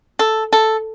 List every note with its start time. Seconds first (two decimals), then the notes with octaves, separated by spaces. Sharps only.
0.19 A4
0.53 A4